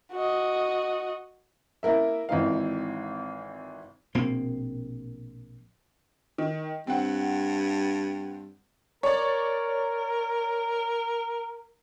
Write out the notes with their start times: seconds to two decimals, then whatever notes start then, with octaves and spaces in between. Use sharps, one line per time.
0.13 F#4 D#5
1.83 A#3 E4 A#4 E5
2.29 G#1 E3 F3 C4 D#4 F5
4.15 A#1 B2 A#3 C4
6.38 D#3
6.87 G2 C4 F#5
9.03 A#4 C#5 D5